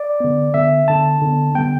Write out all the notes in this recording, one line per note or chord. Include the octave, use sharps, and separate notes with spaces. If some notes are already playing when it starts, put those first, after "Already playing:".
Already playing: D5
D3 B3
D3 B3 E5
D3 B3 A5
D3 B3
D3 G3 B3 G5